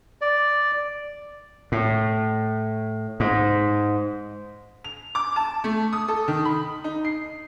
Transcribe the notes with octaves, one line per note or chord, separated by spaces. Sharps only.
D5
A2
G#2
F7
D6
A5
A3
D#6
A4
D#3
B5
D#4
C7